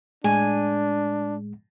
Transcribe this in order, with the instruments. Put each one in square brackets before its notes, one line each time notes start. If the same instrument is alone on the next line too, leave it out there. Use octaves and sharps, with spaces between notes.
[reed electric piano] A2 G#3 [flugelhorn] D4 [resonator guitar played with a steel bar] G#5